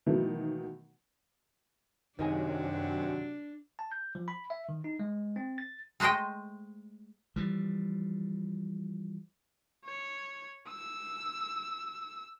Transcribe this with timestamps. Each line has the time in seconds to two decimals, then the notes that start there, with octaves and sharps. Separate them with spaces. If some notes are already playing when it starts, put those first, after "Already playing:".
0.06 B2 D#3 E3 F#3 A3 A#3
2.19 F#2 C3 D#3 F#3 D4 D#4 G#4
3.79 A5
3.92 G6
4.15 F3
4.28 B5
4.50 E5
4.69 D#3
4.84 D#4
4.99 G#3
5.36 C4
5.58 A6
6.00 G#3 A3 C5 D#5 G5
7.36 E3 F3 G3
9.86 C#5
10.68 E6